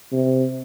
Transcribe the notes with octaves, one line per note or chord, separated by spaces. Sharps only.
C3